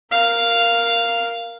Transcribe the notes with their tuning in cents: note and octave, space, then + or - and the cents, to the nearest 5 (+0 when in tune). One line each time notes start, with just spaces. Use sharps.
A#4 +0 F5 +0